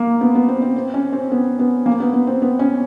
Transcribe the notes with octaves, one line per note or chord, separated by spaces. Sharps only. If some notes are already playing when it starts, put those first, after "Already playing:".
Already playing: A#3
B3
B3
C4
C4
C4
C#4
C4
B3
B3
A#3
B3
B3
C4
B3
C#4